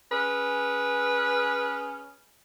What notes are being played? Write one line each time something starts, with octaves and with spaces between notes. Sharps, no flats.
C#4 G#4 B4